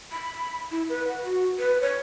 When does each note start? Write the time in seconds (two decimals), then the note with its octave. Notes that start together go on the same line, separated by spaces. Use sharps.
0.12 B5
0.72 E4
0.89 B4
1.08 F#5
1.25 F#4
1.59 B4
1.81 C#5